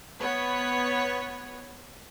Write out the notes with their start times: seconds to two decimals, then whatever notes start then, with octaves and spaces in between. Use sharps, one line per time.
0.20 B3 C#5